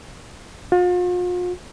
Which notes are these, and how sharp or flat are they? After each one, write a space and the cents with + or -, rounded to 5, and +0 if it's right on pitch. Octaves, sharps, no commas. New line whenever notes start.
F4 +40